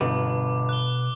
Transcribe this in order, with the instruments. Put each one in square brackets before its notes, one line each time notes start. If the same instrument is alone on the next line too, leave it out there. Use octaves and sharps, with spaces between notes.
[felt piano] G1 [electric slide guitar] B2 B4 [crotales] D6
[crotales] F#6 G7